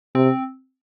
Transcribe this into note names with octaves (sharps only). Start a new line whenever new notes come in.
C3 C4